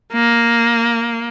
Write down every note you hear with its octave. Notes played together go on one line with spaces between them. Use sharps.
A#3